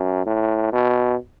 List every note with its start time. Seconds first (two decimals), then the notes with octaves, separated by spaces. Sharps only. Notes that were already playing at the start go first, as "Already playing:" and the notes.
Already playing: F#2
0.26 A2
0.73 B2